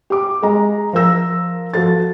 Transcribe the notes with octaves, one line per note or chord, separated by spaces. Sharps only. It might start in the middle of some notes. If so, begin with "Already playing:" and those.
G4 D6
G#3 D#5 A#5
F3 A#4 E6 A#6
F3 F#4 A4 A6